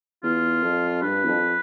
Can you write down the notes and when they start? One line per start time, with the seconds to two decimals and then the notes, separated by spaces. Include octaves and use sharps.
0.23 E2 F4
0.63 F2
1.02 G2 B4
1.24 E2
1.28 F2